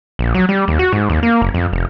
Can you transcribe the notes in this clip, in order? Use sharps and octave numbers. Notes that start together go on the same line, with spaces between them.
A#1
F#3
G3
D#2
F#4
G#2
D#2
A#3
F#1
F2
F1